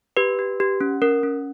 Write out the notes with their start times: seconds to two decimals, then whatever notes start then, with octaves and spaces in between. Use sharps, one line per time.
0.17 G4 B4
0.39 G4
0.60 G4
0.81 C#4
1.02 C#4 A#4
1.23 C#4